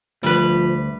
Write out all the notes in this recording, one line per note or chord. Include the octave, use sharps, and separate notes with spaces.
D2 F3 G3 B4